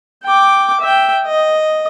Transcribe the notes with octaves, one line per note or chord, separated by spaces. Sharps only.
G5 D6
E5 G5
D#5